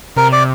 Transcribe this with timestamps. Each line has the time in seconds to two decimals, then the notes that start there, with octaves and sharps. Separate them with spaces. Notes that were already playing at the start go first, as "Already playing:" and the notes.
0.17 C3 A#4
0.32 D5